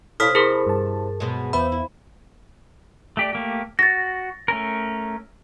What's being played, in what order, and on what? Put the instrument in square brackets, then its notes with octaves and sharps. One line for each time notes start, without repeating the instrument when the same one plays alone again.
[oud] C3 E4 [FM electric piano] A4 C#5 F5 [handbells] D#6 F6 B6
[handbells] G#4 A#4 [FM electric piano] A5 B5 C6
[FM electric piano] G2 A5
[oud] B2 F#3 G#3
[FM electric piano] E2 B3 E5 [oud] F3 [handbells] B5
[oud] E4
[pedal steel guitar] A3 G4 D5
A3 A#3 G4
[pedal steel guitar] F#4 [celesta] A6 A#6
[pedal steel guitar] A3 C#4 A#4